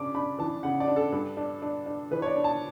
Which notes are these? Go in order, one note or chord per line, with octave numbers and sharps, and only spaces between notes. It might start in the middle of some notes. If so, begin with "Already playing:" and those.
Already playing: C#3 D4 D6
D4 B5
E3 A5
C#3 F#5
D5
D4
A4
G2
D4
D4
D4
E3 B4
C#5
D5
D4
A5